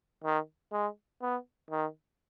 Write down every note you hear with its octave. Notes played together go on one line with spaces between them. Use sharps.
D#3
G#3
B3
D#3